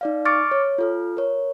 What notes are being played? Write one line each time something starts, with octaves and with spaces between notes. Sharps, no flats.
D#4 D5 F5
C#6 D6 F6 A6 C#7 D7
C#5
F4 A4 F6
A#4 C#5